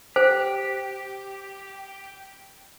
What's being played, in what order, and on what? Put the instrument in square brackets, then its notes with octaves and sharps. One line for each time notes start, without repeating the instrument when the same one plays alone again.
[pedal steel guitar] G4 [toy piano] C5